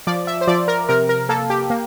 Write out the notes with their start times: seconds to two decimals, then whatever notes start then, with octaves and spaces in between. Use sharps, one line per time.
0.07 F3 D5
0.27 E5
0.41 C5
0.47 F3 D5
0.68 A#4
0.89 C3 A#4
1.09 A#4
1.29 A#3 A4
1.50 G4
1.70 A#3